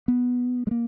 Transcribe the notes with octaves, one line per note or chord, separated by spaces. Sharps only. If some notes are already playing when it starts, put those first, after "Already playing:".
B3
G#3
A#3